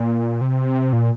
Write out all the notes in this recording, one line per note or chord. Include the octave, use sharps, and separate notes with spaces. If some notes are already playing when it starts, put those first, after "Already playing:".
Already playing: A#2
C3
A#2